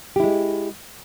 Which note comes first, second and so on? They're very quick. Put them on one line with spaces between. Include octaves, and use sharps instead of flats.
G4 E4 G#3